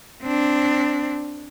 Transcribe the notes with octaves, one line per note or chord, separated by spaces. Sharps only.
C4 D4